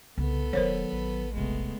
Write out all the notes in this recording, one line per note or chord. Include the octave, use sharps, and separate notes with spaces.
C2 C#3 B3 A4 B4
E1 D#3 F#3 A#4 C5 C#5
A1
D#1 C3 G#3 A3 B3